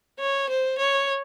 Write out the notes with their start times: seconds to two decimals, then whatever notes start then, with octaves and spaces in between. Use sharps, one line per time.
0.19 C#5
0.49 C5
0.78 C#5